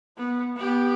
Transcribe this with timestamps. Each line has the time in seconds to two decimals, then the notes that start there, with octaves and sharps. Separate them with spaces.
0.18 B3
0.56 B3 G4